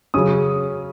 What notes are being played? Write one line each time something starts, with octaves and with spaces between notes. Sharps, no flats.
C#3 F#3 C#4 D#6